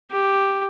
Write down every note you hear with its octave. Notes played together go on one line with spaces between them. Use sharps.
G4